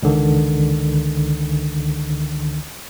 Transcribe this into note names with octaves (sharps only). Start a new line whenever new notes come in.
C#2 D3 D#3